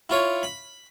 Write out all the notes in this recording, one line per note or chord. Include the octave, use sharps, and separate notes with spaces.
E4 F4 C#5
B5